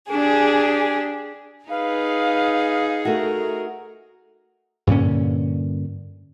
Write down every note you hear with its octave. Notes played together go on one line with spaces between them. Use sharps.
D4 G4 G#4
D#4 G#4 B4 F5
A3 F#4 A#4
G2 A#2 D3 C#4